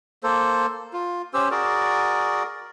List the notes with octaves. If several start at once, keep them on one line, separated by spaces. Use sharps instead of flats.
A#3 A4 C5
F4
C#4 G4 C5 E6
F#4 G#4 A#4 D5